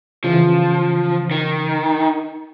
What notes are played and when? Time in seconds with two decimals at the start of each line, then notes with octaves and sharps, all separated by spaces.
0.24 C#3 E3 F3
1.31 D#3